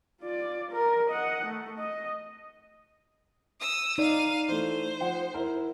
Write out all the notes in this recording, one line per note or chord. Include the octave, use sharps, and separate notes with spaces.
F4 D5
A#4
D#5 F#5
A3
D#5
D#6 E6
D#4 D5 F5 D#7
E3 A3 C5
F3 F#5
E4 A#4